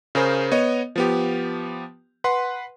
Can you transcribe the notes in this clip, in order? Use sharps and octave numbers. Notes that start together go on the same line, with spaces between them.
C#3 G#4 A#4 C5
B3 C#5 D#5
F3 B3 G4
B4 F#5 C6